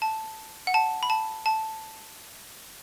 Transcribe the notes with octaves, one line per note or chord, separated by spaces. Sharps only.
A5
F#5
A5
B5
A5
A5